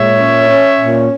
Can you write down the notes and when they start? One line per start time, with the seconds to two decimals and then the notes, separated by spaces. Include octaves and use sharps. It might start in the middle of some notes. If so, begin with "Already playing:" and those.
Already playing: A#2 G#3 C#5 E5
0.18 C#4
0.49 C#4
0.80 A#2